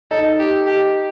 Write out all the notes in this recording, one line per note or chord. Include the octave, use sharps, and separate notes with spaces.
D#4 A4
G4
G4